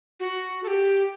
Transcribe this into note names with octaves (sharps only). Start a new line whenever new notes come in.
F#4
A4
G4